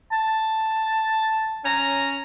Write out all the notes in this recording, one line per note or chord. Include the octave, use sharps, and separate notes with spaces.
A5
C#4 A#5